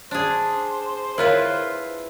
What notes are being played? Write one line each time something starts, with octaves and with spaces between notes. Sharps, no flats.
D4 G#4 C5
E4 F4 A#4 B4 C#5 F5